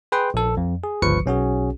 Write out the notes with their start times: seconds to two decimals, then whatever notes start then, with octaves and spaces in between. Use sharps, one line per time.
0.12 G#4 B4 G5 C6
0.34 A#1 A4
0.57 F2
0.83 G#4
1.02 G1 C#2 F3 B4 C#6 C#7
1.26 B1 C#4 F#4 G#4